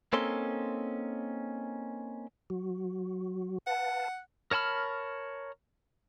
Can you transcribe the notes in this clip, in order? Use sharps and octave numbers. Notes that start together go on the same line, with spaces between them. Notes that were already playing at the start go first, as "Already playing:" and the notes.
A#3 C4 C#4 D#4 A4 C6
F#3 F#4
B4 F5 F#5 A5
A#4 C#5 A5 B5 F6